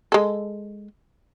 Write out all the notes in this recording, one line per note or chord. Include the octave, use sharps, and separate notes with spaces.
G#3 A4